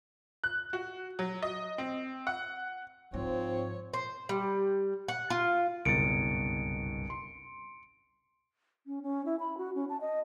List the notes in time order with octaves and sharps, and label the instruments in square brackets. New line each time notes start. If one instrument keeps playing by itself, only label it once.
[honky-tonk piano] F#6
F#4
F#3
D#5
C4
F#5
[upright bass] G#2 [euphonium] F3 [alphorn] C4 [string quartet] C#5
[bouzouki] C5
G3
F#5
F4
[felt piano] F#1 B2 A6 [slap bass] C2 G2 [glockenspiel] C#7 D7
[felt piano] C6
[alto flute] C#4
C#4
E4
B5
F#4
C#4
A5
D#5